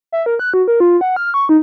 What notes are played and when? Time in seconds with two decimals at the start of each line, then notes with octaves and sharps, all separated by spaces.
0.12 E5
0.26 A#4
0.39 F#6
0.54 F#4
0.68 A#4
0.80 F4
1.01 F#5
1.16 F6
1.34 C#6
1.49 D#4